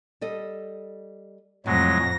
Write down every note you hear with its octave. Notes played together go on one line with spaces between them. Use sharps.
G3 A4 D#5
F2 A2 C3 F#3 G#3 A#6